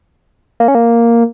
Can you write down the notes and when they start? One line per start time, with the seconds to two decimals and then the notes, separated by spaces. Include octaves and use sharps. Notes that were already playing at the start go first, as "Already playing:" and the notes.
0.60 A#3
0.68 C#4
0.75 A#3